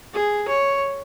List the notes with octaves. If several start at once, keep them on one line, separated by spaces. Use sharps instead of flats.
G#4
C#5